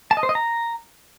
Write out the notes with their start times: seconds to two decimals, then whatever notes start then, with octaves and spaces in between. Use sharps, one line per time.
0.11 A5
0.17 D#5
0.23 C5
0.29 D#5
0.35 A#5